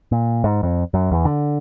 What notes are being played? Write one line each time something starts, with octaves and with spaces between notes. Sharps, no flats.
A#2
G#2
F2
F#2
E2
D3